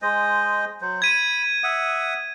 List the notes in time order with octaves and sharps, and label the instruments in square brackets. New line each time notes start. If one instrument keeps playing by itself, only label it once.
[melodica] G#3 C5 D#5
F#3 C5
[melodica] B5 [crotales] G#6 D#7
[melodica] E5 F#5 D#6